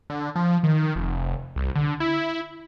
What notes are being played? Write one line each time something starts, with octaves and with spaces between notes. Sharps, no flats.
D3
F3
D#3
F1
C2
D3
E4